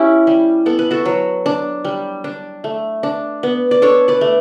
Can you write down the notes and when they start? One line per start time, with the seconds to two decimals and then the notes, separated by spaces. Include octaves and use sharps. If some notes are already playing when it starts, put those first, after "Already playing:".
Already playing: C#4 E4 G4
0.27 G3
0.66 B3 A4
0.79 B4
0.91 F#4 A4
1.05 F#3
1.46 D4
1.85 G3
2.24 D4
2.64 A3
3.03 D4
3.43 B3
3.71 D5
3.82 D4 A4 C#5
4.08 B4 D5
4.21 A3